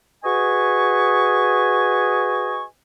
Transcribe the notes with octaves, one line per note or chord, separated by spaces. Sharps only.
F#4 G#4 B4 D#5 G#5 C#6